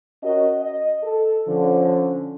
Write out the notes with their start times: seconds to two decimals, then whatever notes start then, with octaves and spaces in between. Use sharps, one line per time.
0.23 C#4 F#4 A#4 D#5
0.61 D#5
1.03 A4
1.48 D3 F3 C#4